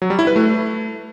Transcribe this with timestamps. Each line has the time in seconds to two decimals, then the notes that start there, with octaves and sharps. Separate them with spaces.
0.02 F#3
0.10 G3
0.19 E4
0.27 B4
0.36 A3